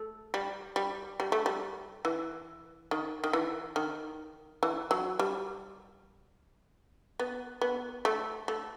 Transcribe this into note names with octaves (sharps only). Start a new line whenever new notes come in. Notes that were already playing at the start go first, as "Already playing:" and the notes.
Already playing: A3
G3
G3
G3
A3
G3
E3
D#3
D#3
E3
D#3
E3
F#3
G3
B3
B3
A3
A3